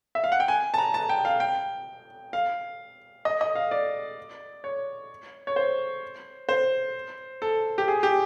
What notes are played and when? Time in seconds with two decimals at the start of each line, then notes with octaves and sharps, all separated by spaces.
0.15 E5
0.24 F5
0.32 F#5
0.40 G5
0.48 G#5
0.74 A5
0.78 A#5
0.94 A5
1.09 G5
1.25 F5
1.40 G5
2.33 F5
3.25 D#5
3.41 D#5
3.55 F5
3.71 D5
4.64 C#5
5.47 C#5
5.56 C5
6.49 C5
7.42 A4
7.78 G4
7.88 G#4
8.03 G4